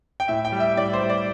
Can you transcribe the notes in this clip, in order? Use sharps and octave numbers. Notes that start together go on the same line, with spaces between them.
G5
A2 E5
G5
G3
E5
A2 D5
C5
G3
D5